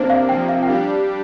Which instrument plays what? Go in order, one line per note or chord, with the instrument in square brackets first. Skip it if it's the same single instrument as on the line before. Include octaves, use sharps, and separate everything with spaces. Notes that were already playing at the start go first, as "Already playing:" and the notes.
Already playing: [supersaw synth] C3 A#3 D4 [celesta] C5
[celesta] F5
[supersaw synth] C3 F3 A#3 [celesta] G5
[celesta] F5
G5
[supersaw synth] G3 D4 G4 [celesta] F5